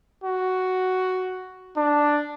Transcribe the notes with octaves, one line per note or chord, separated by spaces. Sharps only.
F#4
D4